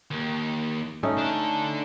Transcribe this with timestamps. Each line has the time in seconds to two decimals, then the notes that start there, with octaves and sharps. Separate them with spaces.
0.11 D#2
1.03 A3 C#4 D#4
1.18 D4 A4